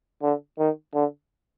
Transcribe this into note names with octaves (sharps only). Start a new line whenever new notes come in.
D3
D#3
D3